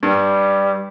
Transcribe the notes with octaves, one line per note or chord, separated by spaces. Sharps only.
G2 G3